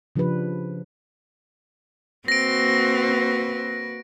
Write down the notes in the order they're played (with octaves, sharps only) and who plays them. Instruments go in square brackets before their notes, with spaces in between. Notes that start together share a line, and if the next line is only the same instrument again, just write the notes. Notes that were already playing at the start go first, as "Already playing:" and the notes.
[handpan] C#3 F3 D4 G4 B4
[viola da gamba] A#3 F#4 B4 [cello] C4 [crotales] A#6 D7